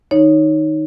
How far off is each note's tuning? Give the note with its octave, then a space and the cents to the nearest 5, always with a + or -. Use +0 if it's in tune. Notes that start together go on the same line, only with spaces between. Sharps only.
D#3 -5 D#4 +0 C#5 +0